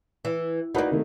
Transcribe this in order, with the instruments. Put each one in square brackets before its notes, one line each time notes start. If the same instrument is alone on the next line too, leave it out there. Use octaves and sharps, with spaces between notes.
[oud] E3
[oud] A#3 D#4 [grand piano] F#4 B4 D5
[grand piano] C3 D#3 A3